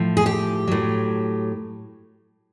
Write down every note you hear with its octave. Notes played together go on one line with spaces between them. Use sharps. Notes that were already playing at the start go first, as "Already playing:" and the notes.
Already playing: A2 F3
G#4
G4
A2 F#3